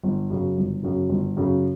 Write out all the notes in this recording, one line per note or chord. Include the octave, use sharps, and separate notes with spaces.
G1
F#2 C#3
G1
F#2 C#3
G1
F#2 C#3